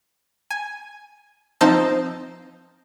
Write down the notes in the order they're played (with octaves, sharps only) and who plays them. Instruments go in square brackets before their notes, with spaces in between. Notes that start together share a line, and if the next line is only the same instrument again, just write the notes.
[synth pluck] G#5
F3 C4 D#4 C5 A5 E6